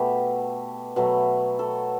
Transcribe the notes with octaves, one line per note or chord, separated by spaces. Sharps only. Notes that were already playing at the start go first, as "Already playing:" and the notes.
Already playing: B2 A3 G4
B2 F#3 A3
A4